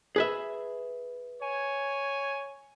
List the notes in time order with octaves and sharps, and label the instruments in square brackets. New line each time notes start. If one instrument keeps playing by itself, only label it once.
[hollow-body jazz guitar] G#4 B4 E5
[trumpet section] C#5 G#5